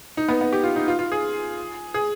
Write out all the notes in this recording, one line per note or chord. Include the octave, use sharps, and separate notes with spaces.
D#4
B3
B3
G4
F4
D#4
F4
F4
G#4
G#4